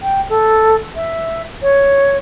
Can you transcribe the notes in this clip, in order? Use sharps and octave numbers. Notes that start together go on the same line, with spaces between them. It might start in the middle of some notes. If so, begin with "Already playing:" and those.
G5
A4
E5
C#5